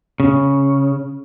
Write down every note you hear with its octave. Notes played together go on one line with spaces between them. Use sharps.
C#3